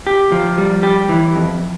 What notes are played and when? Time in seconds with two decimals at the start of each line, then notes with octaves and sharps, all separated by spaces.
0.07 G4
0.32 F3
0.58 G3
0.83 G4
1.09 E3
1.36 F2